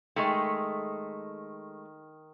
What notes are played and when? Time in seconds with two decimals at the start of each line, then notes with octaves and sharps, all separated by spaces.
0.16 D#3 G#3 A3